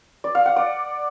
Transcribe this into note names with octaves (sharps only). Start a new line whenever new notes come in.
D5
F5
F#5
D5